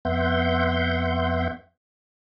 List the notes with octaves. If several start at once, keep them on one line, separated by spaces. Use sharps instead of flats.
F2 B3 E5 F#5 C6 G6